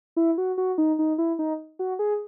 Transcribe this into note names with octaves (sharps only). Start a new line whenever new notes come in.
E4
F#4
F#4
D#4
D#4
E4
D#4
F#4
G#4